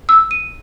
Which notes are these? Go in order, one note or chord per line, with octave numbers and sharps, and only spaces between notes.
E6
D#7